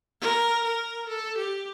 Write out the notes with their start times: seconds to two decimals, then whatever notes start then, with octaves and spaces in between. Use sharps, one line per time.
0.21 A#4
0.64 A#4
1.09 A4
1.37 G4